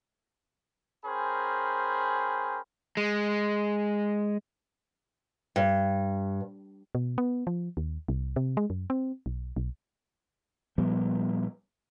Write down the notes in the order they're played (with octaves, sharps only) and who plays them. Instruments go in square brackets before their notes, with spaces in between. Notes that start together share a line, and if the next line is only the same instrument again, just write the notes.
[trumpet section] C#4 G#4 A#4 C5 G5 B5
[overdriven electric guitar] G#3
[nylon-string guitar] G2
[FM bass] B2
B3
F3
D#2
C2
C3
G#3
F#2
C4
B1
B1
[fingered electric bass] A#2 F3 G3 B3